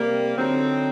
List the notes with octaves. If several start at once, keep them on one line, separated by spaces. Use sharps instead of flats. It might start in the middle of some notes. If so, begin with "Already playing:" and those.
Already playing: C3 G3 A#3
D3 F#3 C4 D#4